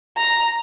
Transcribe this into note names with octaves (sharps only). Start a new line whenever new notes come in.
A#5